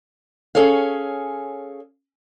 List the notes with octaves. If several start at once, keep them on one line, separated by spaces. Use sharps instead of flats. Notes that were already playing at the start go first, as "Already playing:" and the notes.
C#4 G#4 A4 C#5 F5